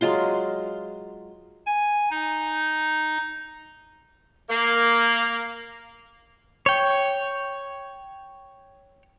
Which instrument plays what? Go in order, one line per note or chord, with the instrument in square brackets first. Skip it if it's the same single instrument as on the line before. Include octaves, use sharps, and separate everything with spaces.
[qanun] F#3 G#3 F4 C6
[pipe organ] G#5
D#4
[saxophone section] A#3
[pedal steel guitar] C#5 G5